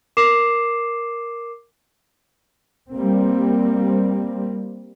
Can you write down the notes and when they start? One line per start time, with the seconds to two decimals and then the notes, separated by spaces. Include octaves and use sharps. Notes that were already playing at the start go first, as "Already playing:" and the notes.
0.17 A#4 D6 C7 E7
2.92 G3 A#3 C4